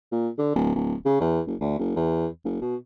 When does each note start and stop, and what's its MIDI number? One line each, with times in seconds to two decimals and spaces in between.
0.12 0.29 46
0.38 0.55 50
0.55 0.72 26
0.75 0.94 26
1.06 1.19 49
1.20 1.40 40
1.47 1.55 30
1.61 1.77 38
1.78 1.92 30
1.96 2.27 40
2.45 2.61 30
2.61 2.75 47